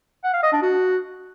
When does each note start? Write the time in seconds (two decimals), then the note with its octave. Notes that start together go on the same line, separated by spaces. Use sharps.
0.24 F#5
0.34 F5
0.43 D#5
0.53 D4
0.62 F#4